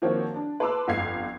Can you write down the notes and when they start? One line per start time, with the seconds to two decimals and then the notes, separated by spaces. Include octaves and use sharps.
0.02 D#3 F3 A#3 C4 F#4 C#5
0.34 D4
0.60 B4 A5 C6 D6 E6
0.88 G1 F2 F5 G#6 C7